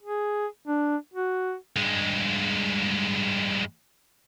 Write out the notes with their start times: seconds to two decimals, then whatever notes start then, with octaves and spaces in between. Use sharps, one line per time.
0.02 G#4
0.67 D4
1.14 F#4
1.76 G2 G#3